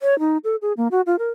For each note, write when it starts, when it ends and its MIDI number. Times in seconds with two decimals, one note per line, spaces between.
0.01 0.18 73
0.19 0.38 63
0.44 0.56 69
0.62 0.73 68
0.77 0.88 58
0.91 1.01 66
1.06 1.16 65
1.19 1.30 70